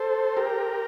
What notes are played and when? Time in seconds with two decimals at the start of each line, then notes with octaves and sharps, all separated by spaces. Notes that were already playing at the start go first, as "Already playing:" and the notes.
Already playing: A4 C5
0.36 G4 A#4